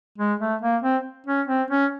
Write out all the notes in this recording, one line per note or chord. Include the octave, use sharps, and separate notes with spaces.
G#3
A3
A#3
C4
C#4
C4
C#4